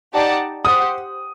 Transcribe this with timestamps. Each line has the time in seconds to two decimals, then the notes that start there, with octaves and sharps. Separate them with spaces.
0.14 D#4 G4 D5 F#5 A5
0.64 G4 C5 F#5 D#6